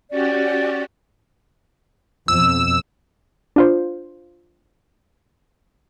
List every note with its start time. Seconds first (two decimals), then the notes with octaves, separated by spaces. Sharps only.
0.10 C#4 F#4 G4 D5
2.28 F2 B2 E6
3.56 D4 F4 C5